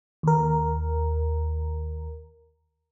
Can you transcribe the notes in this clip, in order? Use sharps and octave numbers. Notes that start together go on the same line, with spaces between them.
D#2 A#4